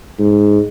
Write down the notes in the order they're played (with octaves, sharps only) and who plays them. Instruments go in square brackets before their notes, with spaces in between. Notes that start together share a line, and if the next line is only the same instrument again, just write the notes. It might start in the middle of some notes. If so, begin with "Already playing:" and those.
[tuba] G#2